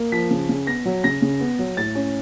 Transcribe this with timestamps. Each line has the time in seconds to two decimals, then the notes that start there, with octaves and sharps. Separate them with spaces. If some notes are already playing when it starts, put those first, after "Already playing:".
Already playing: A#3
0.12 F3 B6
0.31 C#3
0.49 C#3
0.67 B3 A#6
0.85 F#3
1.04 C#3 A#6
1.22 C#3
1.40 B3
1.59 F#3
1.77 A2 A6
1.95 C#4